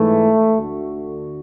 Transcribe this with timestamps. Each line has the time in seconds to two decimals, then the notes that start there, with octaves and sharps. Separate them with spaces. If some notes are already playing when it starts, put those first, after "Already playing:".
Already playing: G#2 E3 A3
0.56 D2 D3 F#4